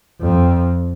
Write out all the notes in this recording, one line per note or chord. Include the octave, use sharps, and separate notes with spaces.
F2